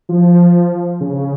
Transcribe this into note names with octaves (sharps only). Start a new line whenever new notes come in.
F3
C#3